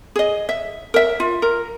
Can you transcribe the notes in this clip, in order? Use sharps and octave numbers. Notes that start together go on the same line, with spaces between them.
G#4 D#5
E5
A#4 E5
F4
A#4